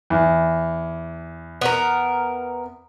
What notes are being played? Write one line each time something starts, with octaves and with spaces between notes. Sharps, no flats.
E2
B3 A#4